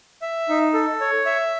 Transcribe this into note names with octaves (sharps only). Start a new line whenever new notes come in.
E5
D#4
A4
C#5
E5